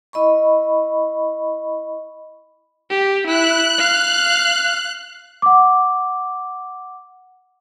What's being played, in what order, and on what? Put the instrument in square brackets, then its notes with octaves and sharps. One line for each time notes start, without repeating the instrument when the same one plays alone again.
[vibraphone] E4 D#5 B5 C#6
[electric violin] G4
[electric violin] E4 [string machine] F#6
[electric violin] F5
[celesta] F#5 D6